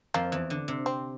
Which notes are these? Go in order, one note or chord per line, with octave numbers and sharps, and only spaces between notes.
F2 F3 A#3
E2 E3
D3
C3
C4